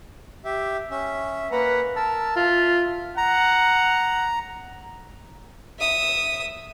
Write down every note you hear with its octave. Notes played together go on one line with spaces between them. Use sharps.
G4 E5
C#4 E5
A#3 B4 F#5 A#5
A#4 A5 E6
F4 E5
F#5 A#5
E5 D#6